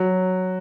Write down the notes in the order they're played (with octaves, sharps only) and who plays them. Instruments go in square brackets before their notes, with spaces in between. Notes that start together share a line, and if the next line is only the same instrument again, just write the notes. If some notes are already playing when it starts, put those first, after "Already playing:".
Already playing: [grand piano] F#3